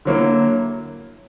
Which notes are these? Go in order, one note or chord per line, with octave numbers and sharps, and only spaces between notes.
D3 F#3 A#3 E4